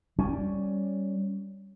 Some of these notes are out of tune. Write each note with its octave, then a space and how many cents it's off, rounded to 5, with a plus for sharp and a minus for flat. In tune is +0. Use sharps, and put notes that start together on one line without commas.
G3 -5 C#4 +0